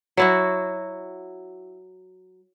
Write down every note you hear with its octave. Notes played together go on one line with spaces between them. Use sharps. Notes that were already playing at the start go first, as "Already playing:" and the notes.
F#3 E4 F#4